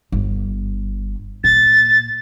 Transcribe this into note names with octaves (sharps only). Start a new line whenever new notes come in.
G1
A#2 A6